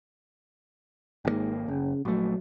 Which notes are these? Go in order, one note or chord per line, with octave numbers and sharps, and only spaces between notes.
G#1 G#2 B2 A#3
F#1 C#3
A#1 F#3 A3